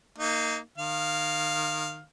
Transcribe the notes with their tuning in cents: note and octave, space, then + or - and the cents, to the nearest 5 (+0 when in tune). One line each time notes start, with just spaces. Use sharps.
A#3 -20 D#4 +0
D#3 -25 F5 +0